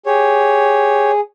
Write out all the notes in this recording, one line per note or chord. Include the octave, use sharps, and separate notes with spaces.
G4 G#4 C#5